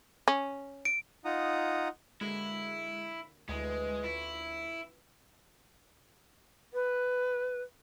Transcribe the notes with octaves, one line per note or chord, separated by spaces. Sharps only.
C#4
D7
D#4 F4 F#5 A#5 D#6
D3 F#3 G#3 A#3 E4
D2 E3 G#3 B3
C#4 E4 F4
B4